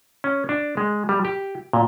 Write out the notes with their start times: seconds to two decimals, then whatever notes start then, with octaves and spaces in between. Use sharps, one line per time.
0.24 C#4
0.49 D4
0.77 G#3
1.09 G3
1.25 G4
1.73 A#2